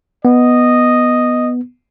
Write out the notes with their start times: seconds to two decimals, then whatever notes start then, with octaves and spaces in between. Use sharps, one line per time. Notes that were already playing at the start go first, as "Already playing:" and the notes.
0.25 B3 D#5